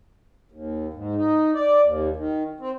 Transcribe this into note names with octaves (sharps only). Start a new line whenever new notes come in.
D#2
G#2
D#4
D5
D#2
D#3
C4